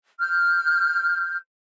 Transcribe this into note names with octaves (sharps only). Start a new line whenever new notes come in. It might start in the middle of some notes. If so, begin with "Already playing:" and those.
F6 G6